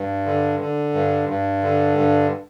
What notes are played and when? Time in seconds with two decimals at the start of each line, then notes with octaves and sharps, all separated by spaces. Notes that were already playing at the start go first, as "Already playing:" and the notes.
Already playing: G2
0.26 D3
0.60 D3
0.94 G2
1.29 G2
1.63 D3
1.98 G2